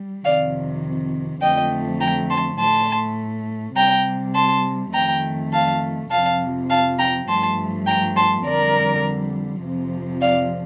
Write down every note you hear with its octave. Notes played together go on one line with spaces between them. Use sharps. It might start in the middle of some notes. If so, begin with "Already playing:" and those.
Already playing: G3
F2 C3 D#3 D5 F5
F2 D3 F3 A3 D#5 G5
G5 A#5
A5 C6
A2 A3 A5 C6
C3 G3 G5 A#5
A5 C6
F2 D#3 A3 G5 A#5
F5 A5
F2 C3 F3 F5 A5
F5 A5
G5 A#5
G2 F3 A3 A5 C6
G5 A#5
A5 C6
F2 D3 G3 A#4 D5
F2 C3 F3
D5 F5